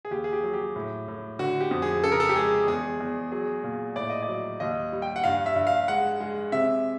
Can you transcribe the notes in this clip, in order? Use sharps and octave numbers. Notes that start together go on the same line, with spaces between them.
G#4
D#2 G4
G#4
G4
F#3
G4
A2
A2
D3 F#4
G4
F2
G#4
C#3 A4
A#4
A4
G4
G#3 G#4
E2 G#4
E2
F#3 G#4
A#2
A2 D5
D#5
D5
F#3
D#2 D#5
G3
G5
F#5
G2 F5
E5
G2
F5
G#3 F#5
G#3
C3 E5